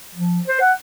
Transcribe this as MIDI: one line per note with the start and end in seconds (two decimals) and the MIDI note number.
0.15 0.40 53
0.48 0.60 72
0.61 0.72 78